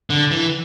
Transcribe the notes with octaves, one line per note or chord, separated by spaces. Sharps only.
D3
E3